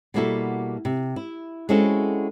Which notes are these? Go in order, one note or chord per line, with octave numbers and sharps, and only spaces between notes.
B2 G3 A#3 E4 F#4 A4
C3
E4
G#3 C4 C#4 E4 F#4 A4